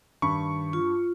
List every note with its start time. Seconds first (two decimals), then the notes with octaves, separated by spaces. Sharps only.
0.22 G2 D#3 B5 C#6
0.73 F4